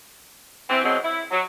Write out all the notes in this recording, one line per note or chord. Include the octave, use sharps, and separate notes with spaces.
E3 C4
B2 E3 F#3 G#3 C4
E4
F#3